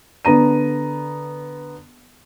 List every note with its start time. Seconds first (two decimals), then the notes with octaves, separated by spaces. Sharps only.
0.25 D3 B3 A#5 D#7